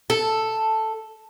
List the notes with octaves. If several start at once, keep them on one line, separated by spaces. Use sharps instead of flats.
A4